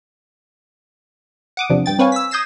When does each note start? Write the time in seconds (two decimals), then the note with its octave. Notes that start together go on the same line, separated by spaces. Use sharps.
1.57 F#5 D6 D#6
1.70 E2 C3 F3 D4
1.86 G2 G5 A6
1.99 C4 B4 C#5 F5 G#5
2.12 E6 B6
2.31 D#6 G6 G#6 A#6 C7 E7